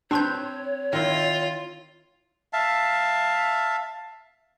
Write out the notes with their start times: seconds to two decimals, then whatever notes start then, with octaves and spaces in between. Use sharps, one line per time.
0.11 C4 D4 B4 C#5 C6 G6
0.93 D#3 E4 F4
2.53 E5 F5 A5